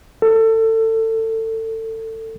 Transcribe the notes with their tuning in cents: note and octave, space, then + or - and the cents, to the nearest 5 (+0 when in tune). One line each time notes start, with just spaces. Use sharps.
A4 +25